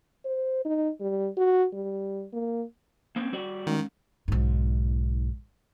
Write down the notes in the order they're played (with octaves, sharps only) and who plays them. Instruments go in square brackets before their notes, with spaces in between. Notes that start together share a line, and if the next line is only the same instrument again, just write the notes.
[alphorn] C5
D#4
G3
F#4
G3
A#3
[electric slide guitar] A#3 C4 C#4
G3 F#4 D5
[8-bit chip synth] D#3 [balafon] G#3 C#4
[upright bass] B1 G#2